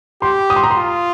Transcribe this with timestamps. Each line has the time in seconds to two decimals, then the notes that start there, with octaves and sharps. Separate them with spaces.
0.22 G4 C6
0.50 D#6
0.56 C6
0.63 A#5
0.71 C6
0.77 F4